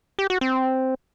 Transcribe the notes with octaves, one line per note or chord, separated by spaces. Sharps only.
G4
F#4
C4